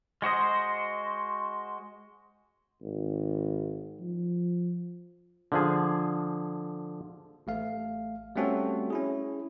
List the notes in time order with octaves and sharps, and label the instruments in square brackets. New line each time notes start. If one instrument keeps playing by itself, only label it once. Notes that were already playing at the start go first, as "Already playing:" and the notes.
[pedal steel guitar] G#3 F#4 C5 D#5
[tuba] G#1
F3
[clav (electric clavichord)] D3 F3 G#4
[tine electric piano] A1 A3 F5
G3 A3 C4 C#4 F#4 A4
C#4 E4 G#4